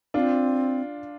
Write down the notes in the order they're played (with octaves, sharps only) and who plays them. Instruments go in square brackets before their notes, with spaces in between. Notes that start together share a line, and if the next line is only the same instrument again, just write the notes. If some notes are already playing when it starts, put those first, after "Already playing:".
[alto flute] C4 [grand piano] D4 F4